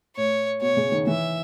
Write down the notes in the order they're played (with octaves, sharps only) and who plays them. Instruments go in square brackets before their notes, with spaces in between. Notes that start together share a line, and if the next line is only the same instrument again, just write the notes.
[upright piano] A2 [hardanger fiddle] C#5
[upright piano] B2 [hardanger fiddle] C#5
[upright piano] C#3
D#3
[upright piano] E3 [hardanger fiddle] E5